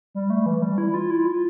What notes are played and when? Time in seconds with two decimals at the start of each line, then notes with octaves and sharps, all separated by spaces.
0.15 G3
0.30 A3
0.46 E3
0.62 G3
0.78 E4
0.94 F4
1.10 E4
1.26 F4